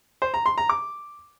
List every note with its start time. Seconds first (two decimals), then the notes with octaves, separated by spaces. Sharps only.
0.22 C5
0.34 A#5
0.46 C6
0.58 A#5
0.69 D6